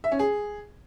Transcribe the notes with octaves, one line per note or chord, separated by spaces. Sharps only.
E5
C#4
G#4